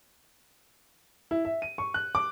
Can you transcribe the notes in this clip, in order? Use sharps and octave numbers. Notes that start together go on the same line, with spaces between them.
E4
E5
D#7
C#6
F#6
D6